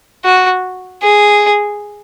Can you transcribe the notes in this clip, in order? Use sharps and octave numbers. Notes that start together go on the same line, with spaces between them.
F#4
G#4